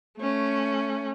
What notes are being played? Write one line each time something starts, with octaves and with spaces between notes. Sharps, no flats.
A3 C#4